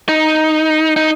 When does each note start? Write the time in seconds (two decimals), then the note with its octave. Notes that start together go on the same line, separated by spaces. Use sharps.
0.09 D#4
0.96 D#4